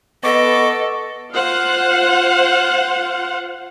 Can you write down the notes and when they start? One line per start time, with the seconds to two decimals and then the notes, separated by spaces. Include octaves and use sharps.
0.24 B3 A4 D#5 C#6 D6
1.34 F4 C5 F5 F#5